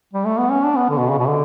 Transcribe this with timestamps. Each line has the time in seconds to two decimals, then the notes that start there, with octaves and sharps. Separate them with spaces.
0.13 G3
0.26 A3
0.39 B3
0.51 C#4
0.64 D4
0.76 B3
0.89 D3
0.98 B2
1.09 C#3
1.18 B2
1.28 D3